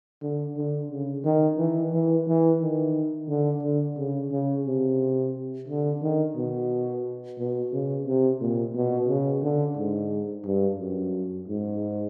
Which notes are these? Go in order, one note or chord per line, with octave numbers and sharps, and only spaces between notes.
D3
D3
C#3
D#3
E3
E3
E3
D#3
D3
D3
C#3
C#3
C3
D3
D#3
B2
B2
C#3
C3
A#2
B2
C#3
D3
G#2
G2
F#2
G#2